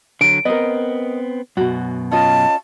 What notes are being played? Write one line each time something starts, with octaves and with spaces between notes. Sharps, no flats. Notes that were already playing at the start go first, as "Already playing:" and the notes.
D3 F#3 D7
B3 C4 A#4 D#5
F#2 B2 F#4
C#4 F4 D#5 A5